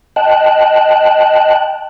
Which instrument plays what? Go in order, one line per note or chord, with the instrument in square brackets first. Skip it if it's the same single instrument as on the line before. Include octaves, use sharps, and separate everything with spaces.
[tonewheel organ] D#5 G5 A5 F#6